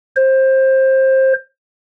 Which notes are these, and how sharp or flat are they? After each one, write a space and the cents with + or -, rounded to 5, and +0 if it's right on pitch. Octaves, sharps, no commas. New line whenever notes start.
C5 +20